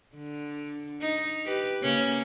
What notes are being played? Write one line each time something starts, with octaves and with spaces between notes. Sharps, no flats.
D3
D#4
G4 B4
C#3 A#3 C#4